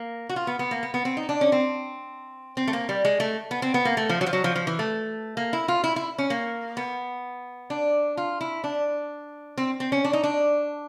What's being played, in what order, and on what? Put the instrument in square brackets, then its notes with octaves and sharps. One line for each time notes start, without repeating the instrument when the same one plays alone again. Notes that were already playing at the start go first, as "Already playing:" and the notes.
Already playing: [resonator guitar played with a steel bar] A#3
F#4
F4
B3
B3
A#3
B3
B3
C4
D#4
D4
C#4
C4
C4
A3
A#3
G3
G#3
A3
B3
C4
B3
A#3
A3
F3
F#3
F3
F#3
F3
F3
E3
A3
A#3
E4
F4
E4
E4
C#4
A#3
B3
D4
F4
E4
D4
C4
C4
C#4
D4
D#4
D4